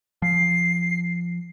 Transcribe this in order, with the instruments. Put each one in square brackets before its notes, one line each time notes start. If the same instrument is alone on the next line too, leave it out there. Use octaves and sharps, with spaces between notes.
[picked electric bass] F3 [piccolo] C7